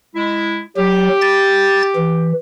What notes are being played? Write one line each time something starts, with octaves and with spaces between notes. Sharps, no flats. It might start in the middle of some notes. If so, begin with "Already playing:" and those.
G#3 E4
F#3 G4
A6
E3